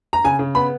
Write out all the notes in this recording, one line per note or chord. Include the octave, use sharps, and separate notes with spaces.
A#5
C#3 G#5
C#3
B3 B5